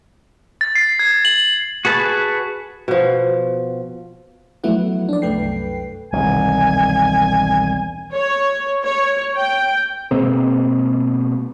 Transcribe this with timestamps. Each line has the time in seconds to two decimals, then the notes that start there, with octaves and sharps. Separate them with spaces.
0.61 A6
0.75 C7
0.99 G#6
1.25 F#7
1.85 F#4 G#4 B4 A5
2.88 B2 F3
4.64 F3 F#3 A3 B3 E4 F#5
5.09 D4 D5
5.22 C2 F#2 A3 B4 G5 C7
6.12 E1 C2 D#3 G#5
8.13 C#5
8.84 C#5
9.37 G5
10.11 B2 G#3 A#3 C4